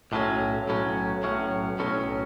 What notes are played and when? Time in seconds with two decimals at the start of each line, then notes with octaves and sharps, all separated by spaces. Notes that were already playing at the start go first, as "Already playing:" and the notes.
0.12 B1 A2 F#3 C#4
0.68 B1 A2 F#3 C#4
1.23 B1 A2 F#3 C#4
1.79 B1 A2 F#3 C#4